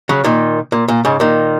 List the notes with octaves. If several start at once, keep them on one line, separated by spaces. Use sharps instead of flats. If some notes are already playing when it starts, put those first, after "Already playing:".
C#3 F#3
A#2 D#3
A#2
A#2
G#2 C#3
A#2 D#3